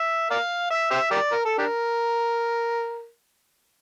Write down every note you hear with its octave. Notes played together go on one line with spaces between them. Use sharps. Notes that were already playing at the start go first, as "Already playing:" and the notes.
Already playing: E5
A#4 D5 F5
E5
G4 C5 E5
G4 A#4 D5
A#4
A4
D4 G4 A#4